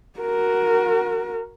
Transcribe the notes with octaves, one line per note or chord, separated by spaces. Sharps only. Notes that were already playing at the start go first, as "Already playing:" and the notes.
F#4 A#4